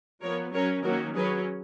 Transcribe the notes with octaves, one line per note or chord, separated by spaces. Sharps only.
F3 B3 A#4 C#5
F#3 C#4 A#4 C#5
D#3 F#3 A#3 C#4 F#4 A#4
F#3 C#4 G#4 B4